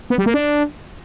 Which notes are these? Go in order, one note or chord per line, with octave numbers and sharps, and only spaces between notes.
B3
G3
A#3
D4